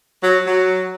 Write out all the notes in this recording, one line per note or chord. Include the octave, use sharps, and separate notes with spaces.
F#3
F#3